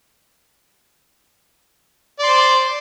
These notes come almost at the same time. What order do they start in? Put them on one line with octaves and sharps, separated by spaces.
D5 C6 C5